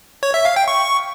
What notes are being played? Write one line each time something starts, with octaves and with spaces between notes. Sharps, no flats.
C#5
E5
F5
G5
C#6